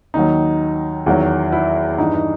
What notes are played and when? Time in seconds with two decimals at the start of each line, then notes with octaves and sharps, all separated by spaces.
0.14 D#2 D#3 F#3 D#4
1.06 E2 D#3 F#3
1.52 E4
1.98 G2 E3 D#4
2.14 D#4